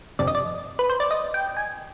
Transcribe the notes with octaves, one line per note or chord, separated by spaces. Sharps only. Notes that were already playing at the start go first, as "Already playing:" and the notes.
G1 F2 C3 D5
D#5
D5
B4
C5
D5
D#5
G5
G#5